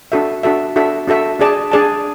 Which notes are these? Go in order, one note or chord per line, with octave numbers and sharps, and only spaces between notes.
D4 F#4 A4 E5
D4 F#4 A4 E5
D4 F#4 A4 E5
D4 F#4 A4 E5
D4 G#4 D5 A5
D4 G#4 D5 A5